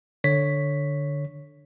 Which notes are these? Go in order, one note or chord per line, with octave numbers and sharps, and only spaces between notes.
D3 C#5 B6